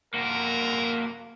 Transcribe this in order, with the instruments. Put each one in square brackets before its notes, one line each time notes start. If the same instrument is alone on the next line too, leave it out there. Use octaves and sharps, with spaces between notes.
[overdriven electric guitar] A#3 F#4 [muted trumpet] A#4